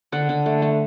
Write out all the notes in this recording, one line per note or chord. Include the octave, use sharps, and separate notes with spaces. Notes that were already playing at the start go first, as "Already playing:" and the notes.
D3 F#5
D3
A3
A3